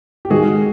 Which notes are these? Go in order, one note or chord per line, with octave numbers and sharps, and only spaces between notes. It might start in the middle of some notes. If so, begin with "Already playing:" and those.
G4
G#2 D#3 G#3 F#4 G#4